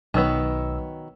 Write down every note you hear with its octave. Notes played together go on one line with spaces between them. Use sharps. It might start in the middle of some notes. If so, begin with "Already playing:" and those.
B1 D#3 F#3 B3 E6